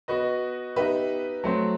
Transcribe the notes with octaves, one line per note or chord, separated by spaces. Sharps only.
B3 F#4 B4 D#5
B3 D#4 G4 B4 E5
F#3 A3 C4